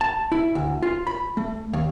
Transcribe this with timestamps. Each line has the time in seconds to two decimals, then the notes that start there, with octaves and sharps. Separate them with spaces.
0.01 A5
0.32 E4
0.55 D2
0.82 F4
1.07 B5
1.37 A3
1.73 D#2